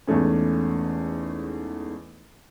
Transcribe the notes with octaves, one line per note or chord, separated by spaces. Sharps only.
E2 G#2 A3 C#4